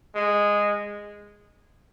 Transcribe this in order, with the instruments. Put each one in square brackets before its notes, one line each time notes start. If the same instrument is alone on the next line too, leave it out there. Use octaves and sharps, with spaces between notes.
[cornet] G#3